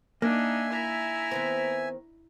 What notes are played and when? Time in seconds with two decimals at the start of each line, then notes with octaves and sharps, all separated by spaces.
0.22 A#3 D4 D#4 E5 G#5
0.70 E4 A#5
1.31 D#3 B3 C4